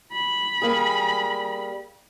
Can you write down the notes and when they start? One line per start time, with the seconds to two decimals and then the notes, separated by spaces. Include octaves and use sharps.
0.13 B5
0.62 G3 A#3 G#4